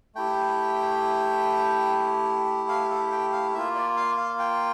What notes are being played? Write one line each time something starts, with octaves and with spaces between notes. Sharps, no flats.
A3 E4 G4 G5
F5
A4
G5
F5
A#3 F4 E5
D5
F5
F5
G5